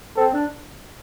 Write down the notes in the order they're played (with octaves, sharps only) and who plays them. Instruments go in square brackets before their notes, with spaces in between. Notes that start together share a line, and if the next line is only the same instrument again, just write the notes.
[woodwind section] C4 [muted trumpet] A4
[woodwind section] D4